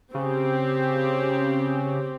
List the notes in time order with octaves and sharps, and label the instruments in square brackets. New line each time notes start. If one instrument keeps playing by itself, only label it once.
[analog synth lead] C#3 [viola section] C4 G4